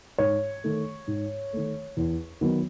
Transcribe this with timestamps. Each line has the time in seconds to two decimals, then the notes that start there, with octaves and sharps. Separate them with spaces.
0.18 G#2 C#5
0.64 D#3 A3
1.07 G#2
1.53 D#3 A3
1.97 E2
2.41 D#3 F#3 B3